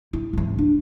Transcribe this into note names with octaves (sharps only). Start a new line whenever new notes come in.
E4
G#1 E3
D4